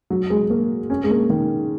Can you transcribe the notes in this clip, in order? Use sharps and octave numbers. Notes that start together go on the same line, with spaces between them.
F#3
G#3
A#3
C#4
G#3
A#3
D#3